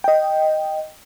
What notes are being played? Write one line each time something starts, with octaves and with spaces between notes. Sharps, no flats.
D#5 G5